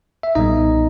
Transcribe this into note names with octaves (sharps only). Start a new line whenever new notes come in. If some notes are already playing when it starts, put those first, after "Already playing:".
E5
B1 A#2 G3 B3 D#4 D#5